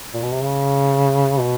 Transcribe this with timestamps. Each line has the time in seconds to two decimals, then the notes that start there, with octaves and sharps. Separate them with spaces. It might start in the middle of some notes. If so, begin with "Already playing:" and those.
0.14 A#2
0.22 B2
0.32 C3
0.41 C#3
1.40 B2